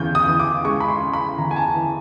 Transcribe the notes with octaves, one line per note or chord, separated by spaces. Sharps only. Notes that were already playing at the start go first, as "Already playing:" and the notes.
Already playing: E2 C#3 G6
D#6
E3
D6
G#3 C#6
B5
C6
C#3
B5
E2 A#5
G#5
A5
E3